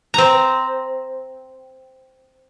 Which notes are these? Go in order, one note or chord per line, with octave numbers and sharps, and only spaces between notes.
C4 A#5